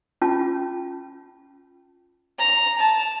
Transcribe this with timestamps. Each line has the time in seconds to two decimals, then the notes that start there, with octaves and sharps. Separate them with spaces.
0.22 C#4 F4 A5
2.39 A#5
2.79 A5